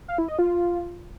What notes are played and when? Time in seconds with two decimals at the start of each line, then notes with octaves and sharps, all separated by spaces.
0.08 F5
0.18 E4
0.28 D#5
0.39 F4